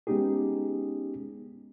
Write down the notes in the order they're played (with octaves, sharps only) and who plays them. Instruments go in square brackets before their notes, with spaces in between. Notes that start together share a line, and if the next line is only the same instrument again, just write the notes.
[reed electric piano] G#3 B3 C#4 D#4 G4 G#4